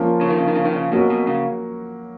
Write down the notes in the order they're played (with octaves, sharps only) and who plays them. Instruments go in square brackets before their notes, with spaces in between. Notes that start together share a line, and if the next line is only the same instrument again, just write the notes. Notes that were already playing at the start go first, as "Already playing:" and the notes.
Already playing: [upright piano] F3 A#3 C#4 F4
[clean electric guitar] C#3
D#3
C#3
D#3
C#3
D#3
C#3
[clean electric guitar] B2 [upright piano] F#3 A#3 C#4 F#4
[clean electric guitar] B2
C#3